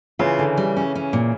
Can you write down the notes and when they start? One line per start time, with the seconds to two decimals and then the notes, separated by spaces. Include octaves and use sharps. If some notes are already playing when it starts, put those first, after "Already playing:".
0.19 C#3 E3 F4
0.39 D3
0.57 G3
0.77 C#4
0.95 C#4
1.13 A#2